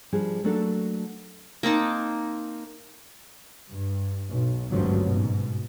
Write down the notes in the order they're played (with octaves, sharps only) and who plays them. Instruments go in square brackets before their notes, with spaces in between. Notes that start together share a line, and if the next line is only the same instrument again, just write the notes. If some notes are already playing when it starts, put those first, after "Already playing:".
[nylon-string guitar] F3 G3 D4 G#4
F#3 A3 A#3 D4 A4
[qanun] A#3 C4 D#4 A5
[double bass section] G2
B1
G#1 D2 G2 C#3 F3 F#3
G#2 B2